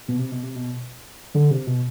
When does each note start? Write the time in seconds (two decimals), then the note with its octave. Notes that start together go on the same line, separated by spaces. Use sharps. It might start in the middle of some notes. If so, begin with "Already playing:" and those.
0.08 B2
0.19 C3
0.32 B2
0.43 C3
0.56 B2
1.35 D3
1.51 C3
1.67 B2